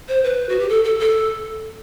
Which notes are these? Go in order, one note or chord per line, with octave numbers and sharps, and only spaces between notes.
C5
B4
F#4
G4
A4
A4
A4